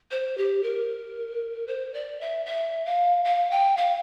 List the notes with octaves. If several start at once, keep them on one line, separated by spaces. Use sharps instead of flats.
C5
G4
A#4
C5
D5
E5
E5
F5
F5
G5
F5